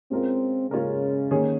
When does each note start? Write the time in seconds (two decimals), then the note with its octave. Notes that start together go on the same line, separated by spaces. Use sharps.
0.11 G#3 C4 C#4 F4 A#4
0.71 C#3 G#3 C#4 F4 A#4
1.31 D#3 A#3 C#4 G#4 C#5